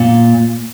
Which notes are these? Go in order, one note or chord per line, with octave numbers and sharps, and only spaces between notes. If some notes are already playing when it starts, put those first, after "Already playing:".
Already playing: A#2